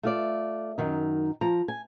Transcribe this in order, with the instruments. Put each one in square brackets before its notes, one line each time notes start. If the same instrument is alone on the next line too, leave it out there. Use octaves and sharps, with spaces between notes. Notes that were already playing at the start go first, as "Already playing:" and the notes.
[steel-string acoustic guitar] A3 F4 D5
F#2 D#3 D#4
F3 A#5
G#5